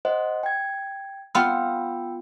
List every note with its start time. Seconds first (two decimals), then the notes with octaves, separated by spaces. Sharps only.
0.05 C5 D#5 F#5
0.43 G5 G#6
1.35 B3 F4 G5 B5 E6